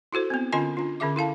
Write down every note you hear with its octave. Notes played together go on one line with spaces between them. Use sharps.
E4 F#4 A4 C5
B3 C4
D3 C#4 F4 D#5 G#5 C6
D4 F4
D3 C#4 G#4 E5 D6
E4 A4 F5 A5